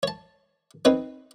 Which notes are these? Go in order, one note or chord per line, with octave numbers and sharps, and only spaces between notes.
C#5 A5
C4 D#4 B4 C#5